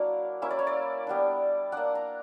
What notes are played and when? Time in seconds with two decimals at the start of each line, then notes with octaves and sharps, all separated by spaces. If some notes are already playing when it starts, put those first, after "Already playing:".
Already playing: F#3 A#3 D4 E4
0.42 A#3 C#4 E4 E5
0.51 D5
0.59 C#5
0.67 D5
1.07 G3 B3 D4
1.72 A#3 D4 F#5
1.95 A#5